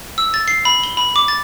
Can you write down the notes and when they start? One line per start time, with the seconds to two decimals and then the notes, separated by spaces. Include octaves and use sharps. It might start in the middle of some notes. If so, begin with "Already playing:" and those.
0.18 E6
0.34 A6
0.48 C7
0.65 B5
0.84 G7
0.97 B5
1.16 D6
1.28 A6